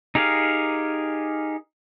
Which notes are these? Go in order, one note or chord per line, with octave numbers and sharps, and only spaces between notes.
D#4 G4 G#4 A#4 F5